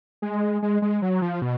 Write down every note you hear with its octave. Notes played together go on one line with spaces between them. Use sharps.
G#3
G#3
G#3
F#3
F3
B2